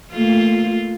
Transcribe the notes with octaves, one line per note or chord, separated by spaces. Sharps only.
A3 A#3 F4